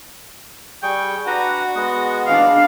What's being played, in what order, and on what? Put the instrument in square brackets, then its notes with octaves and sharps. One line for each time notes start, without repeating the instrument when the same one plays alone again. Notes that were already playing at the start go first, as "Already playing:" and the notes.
[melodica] G3 G#4 C#6 [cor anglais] G5
[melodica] D4 B4 A#5 [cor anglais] F#4
[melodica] G#3 B3 D#5
[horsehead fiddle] D4 F5